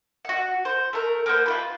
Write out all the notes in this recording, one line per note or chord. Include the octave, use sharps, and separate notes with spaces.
F#4 F#5
C5
A3 A#4
A#3 B3 C5
F4 G4 B4